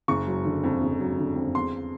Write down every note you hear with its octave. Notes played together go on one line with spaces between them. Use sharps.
F#1 C#6
F#3
D3
F2
F#1
F#3
D3
F2
E2 C6